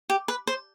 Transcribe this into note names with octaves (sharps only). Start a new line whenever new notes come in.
G4
B4
C5